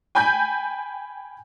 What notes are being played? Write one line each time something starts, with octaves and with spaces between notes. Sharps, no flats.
G5 G#5 B5 G6